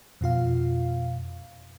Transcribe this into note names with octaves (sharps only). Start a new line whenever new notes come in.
F2 B2 F4 F5